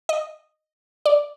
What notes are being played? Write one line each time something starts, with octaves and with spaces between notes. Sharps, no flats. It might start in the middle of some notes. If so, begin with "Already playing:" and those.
D#5
D5